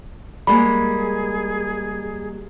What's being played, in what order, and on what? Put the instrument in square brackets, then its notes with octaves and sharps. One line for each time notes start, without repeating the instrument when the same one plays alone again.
[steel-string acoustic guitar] G3 G#3 A#3 [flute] G#4 [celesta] B5